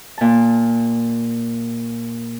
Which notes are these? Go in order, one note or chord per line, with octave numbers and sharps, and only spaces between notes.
A#2 A5